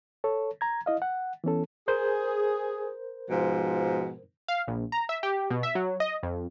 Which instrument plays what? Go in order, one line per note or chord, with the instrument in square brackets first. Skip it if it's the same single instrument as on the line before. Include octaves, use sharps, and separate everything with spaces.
[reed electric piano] A4 C#5
A#5 G#6
E4 D#5 F5
F#5
E3 B3 C#4 A4
[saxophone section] G#4 [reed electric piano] A#4 C5 G6
[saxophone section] G#2 B2 F3
[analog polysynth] F5
A#1
A#5
E5
G4
B2
E5
F#3
D#5
F2